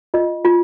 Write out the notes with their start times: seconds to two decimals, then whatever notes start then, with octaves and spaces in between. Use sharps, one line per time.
0.14 F4 D#5
0.45 F4